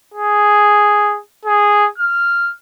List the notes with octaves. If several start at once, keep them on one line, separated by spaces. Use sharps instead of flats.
G#4
G#4
F6